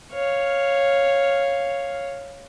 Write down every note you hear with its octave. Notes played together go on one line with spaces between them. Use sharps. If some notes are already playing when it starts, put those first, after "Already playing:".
C#5 F5